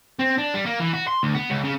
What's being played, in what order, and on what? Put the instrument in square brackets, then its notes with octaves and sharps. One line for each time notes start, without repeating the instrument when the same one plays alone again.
[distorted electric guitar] C4
D4
G3
A#3
E3
F#4
C6
D2
B3
C#2
C#3